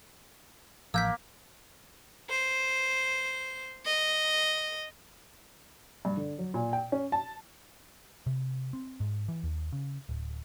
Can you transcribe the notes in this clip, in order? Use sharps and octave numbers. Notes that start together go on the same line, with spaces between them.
A1 F3 A#3 E6 G6 B6
C5
D#5
G2
D3
F#3
A#2
G5
C#4
A5
C3
C4
G#2
E3
D#2
C#3
D1